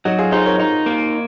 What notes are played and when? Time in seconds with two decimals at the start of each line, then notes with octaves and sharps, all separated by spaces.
0.05 F#3 D#4 F#4
0.19 F4 G#4
0.32 D#4 G#4 C5
0.46 A#4 C#5
0.60 D#4
0.86 A#3